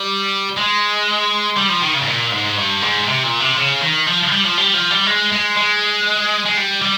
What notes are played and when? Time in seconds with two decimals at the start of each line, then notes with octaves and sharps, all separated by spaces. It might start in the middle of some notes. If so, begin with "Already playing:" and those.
Already playing: G3
0.57 G#3
1.57 G3
1.69 F3
1.82 D#3
1.94 C#3
2.01 G#2
2.07 A#2
2.31 G#2
2.57 G2
2.82 G#2
3.07 C3
3.24 A#2
3.40 C3
3.57 C#3
3.82 D#3
4.07 F3
4.32 G3
4.45 F3
4.57 G3
4.74 F3
4.91 G3
5.07 G#3
5.32 G#3
5.57 G#3
6.46 G#3
6.57 G3
6.82 G3